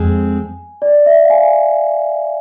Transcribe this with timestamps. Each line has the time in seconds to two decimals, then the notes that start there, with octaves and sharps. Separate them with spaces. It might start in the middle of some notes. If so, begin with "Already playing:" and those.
Already playing: F2 G#3 C4 G#5
0.82 D5
1.06 E5
1.24 F5
1.30 G#5